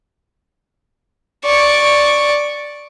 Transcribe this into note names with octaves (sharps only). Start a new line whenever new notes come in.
D5 C#6